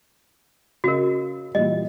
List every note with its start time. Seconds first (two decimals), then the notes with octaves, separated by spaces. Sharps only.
0.84 C#3 F#4 A#4 D#5
1.55 A#2 E3 G3 D#5